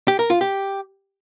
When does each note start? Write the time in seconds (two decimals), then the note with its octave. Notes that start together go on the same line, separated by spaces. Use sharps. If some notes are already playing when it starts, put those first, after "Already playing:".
0.08 G4
0.19 A#4
0.30 F4
0.41 G4